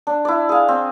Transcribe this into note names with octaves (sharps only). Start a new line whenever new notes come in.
D4
E4 D5
G#4 F5
C4